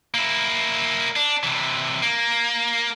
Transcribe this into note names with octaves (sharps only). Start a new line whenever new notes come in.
A#3 E4
D4
C3 E3
A#3